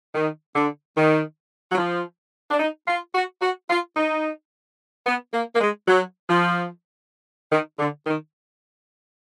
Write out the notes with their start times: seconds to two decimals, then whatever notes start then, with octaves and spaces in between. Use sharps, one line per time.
0.15 D#3
0.56 D3
0.97 D#3
1.72 F#3
1.78 F3
2.51 D4
2.60 D#4
2.88 F4
3.15 F#4
3.42 F#4
3.70 F4
3.97 D#4
5.07 B3
5.34 A#3
5.55 A#3
5.61 G#3
5.88 F#3
6.30 F3
7.52 D#3
7.79 D3
8.07 D#3